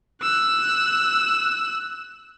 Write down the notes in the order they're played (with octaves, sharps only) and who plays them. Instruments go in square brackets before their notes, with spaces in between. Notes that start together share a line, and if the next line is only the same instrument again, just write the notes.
[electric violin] E6 F#6